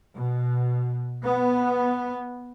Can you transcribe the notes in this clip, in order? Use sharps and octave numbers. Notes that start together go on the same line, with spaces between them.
B2
B3